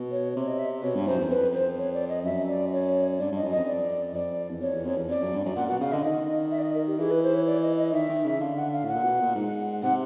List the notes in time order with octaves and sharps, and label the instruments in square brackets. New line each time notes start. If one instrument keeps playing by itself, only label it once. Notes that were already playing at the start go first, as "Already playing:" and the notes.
Already playing: [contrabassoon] B2
[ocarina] C#5
[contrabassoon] C3 [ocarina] C#5
[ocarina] D#5
E5
[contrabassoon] B2 [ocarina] C#5
[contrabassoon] G2
[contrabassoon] F#2 [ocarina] C5
[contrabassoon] E2
[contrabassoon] F2 [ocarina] B4
[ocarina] C5
C#5
D5
D#5
[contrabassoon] F#2 [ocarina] E5
[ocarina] D5
C#5
[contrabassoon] G2 [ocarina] D5
[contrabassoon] G2 [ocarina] D#5
[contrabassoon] F#2
[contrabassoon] F2 [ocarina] D#5
[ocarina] D5
[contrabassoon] F2 [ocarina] D5
[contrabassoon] E2
[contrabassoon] F2 [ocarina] C#5
[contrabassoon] E2
F2
E2
[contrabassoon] F2 [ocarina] D5
[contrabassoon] F#2
G2
F#2
[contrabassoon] A#2 [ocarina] F#5
[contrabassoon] B2 [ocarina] F#5
[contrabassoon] C#3 [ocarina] F5
[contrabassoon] D3 [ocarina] D#5
[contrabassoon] D#3 [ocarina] D#5
[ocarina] E5
D5
D#5
A#4
G4
[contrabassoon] E3 [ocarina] G#4
[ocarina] B4
C5
C#5
D5
D#5
D#5
[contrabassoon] D#3 [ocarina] E5
[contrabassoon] D#3
C#3
[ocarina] E5
[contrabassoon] D3 [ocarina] F5
[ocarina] F#5
F5
[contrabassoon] A2 [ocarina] F#5
[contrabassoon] A#2
B2
A#2
G#2
[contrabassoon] C3 [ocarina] F#5